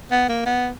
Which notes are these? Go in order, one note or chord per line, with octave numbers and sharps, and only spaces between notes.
B3
A#3
B3